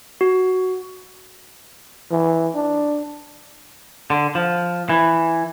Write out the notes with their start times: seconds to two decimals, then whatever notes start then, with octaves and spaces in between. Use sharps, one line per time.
0.21 F#4
2.11 E3
2.55 D4
4.10 D3
4.35 F3
4.89 E3